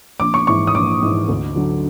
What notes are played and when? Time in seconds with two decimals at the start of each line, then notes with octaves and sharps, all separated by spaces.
0.20 A#1 D6
0.34 C#6
0.47 G#2 E3 C#6
0.67 D#6
0.74 A#1 D6
1.02 G#2 E3
1.28 D2
1.56 D3 F#3